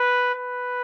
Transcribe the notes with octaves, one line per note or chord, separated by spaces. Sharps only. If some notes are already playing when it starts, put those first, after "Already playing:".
Already playing: B4
B4